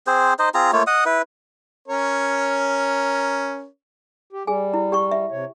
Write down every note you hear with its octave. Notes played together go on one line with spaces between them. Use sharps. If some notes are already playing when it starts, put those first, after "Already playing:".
C4 G#4 C5
D#4 C5 D#5
C4 F4 G#4 A#5
A3 A#3 F4 C#5
D#5 F#5 D#6
E4 B4
C#4 A#4 C#5
G4
G3 G#4 G#5
E4
G4 G5 C#6
E5
C3 C#5